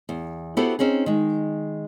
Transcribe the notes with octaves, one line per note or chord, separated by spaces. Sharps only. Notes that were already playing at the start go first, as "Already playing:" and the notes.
E2
B3 E4 F#4 G4 A4 C5
C4 C#4 D#4 G#4
D#3 G#3